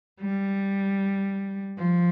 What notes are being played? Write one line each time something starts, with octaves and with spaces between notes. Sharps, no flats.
G3
F3